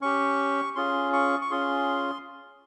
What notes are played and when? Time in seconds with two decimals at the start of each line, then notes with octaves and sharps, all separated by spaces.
0.01 C#4 G4 C#6
0.75 C#4 F4 G#4 C6
1.13 C#6
1.41 C#6
1.51 C#4 F4 G#4 C6